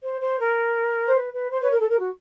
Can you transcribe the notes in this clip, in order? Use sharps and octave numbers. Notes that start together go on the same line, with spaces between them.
C5
C5
A#4
C5
B4
B4
C5
B4 C#5
A#4
A4
A#4
F#4